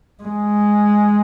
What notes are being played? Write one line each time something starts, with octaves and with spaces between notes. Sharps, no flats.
G#3